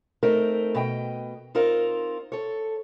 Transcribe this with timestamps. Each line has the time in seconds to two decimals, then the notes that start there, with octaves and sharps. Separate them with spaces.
0.23 A3 C4 D#4 A#4
0.75 B2 D#5 G5
1.55 C4 D#4 F4 A#4
2.32 A4 C#5